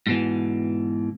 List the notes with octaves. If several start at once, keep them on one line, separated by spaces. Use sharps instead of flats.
G#2 B2 E3